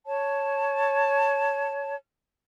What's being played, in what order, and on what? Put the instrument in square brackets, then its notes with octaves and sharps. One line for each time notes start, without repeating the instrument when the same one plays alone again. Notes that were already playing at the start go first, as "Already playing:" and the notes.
[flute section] C#5 A5